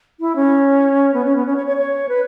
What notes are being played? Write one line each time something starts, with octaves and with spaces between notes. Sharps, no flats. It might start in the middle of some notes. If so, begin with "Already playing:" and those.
E4
C#4
B3
C#4
B3
C#4
C#5
C#5
C#5
B4